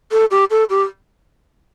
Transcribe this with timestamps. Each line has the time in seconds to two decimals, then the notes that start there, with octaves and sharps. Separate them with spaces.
0.12 A4
0.31 G4
0.51 A4
0.70 G4